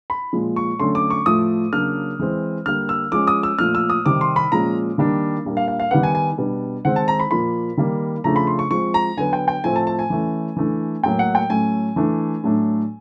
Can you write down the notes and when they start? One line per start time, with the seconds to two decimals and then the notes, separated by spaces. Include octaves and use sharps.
0.10 B5
0.33 A#2 F3 G#3
0.56 C#6
0.79 D3 F#3 A3 C#4 C6
0.95 D6
1.10 C#6
1.26 A2 F3 A3 D#6
1.72 C#3 F#3 A#3 D4 F6
2.19 E3 G#3 C4
2.66 D3 G3 A#3 F6
2.89 E6
3.12 F3 G#3 C#4 D6
3.27 D#6
3.43 E6
3.58 A#2 F3 A3 F6
3.75 E6
3.90 D#6
4.05 C3 D#3 G3 C4 D6
4.21 C6
4.36 B5
4.52 A#2 F3 G#3 C#4 A#5
4.98 D#3 G3 A#3 D4
5.45 A#2 G3 A#3 D4
5.57 F5
5.68 F5
5.80 F5
5.91 D#3 G3 B3 F#5
6.03 G#5
6.15 G#5
6.38 B2 G3 B3 D4
6.85 D#3 G#3 C4 F#5
6.96 A5
7.08 A#5
7.20 B5
7.31 A#2 F3 A#3 B5
7.77 D#3 G3 A#3
8.24 C#3 F3 A3 D4 A#5
8.36 B5
8.47 C6
8.59 C#6
8.71 F3 G#3 C4 C#6
8.94 A#5
9.17 D3 F#3 B3 G#5
9.33 G5
9.48 G5
9.64 A2 F3 A3 C4 G#5
9.76 A5
9.87 A5
9.99 G#5
10.10 E3 A3 C#4
10.57 E3 A3 D4
11.03 A2 F#3 A#3 G5
11.19 F#5
11.35 G5
11.49 A2 F#3 A3 C#4 G#5
11.96 E3 A3 D4
12.43 A2 F#3 A3 D4